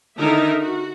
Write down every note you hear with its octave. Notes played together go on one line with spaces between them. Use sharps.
D3 D#3 D#4 E4 A#4 E5
F#4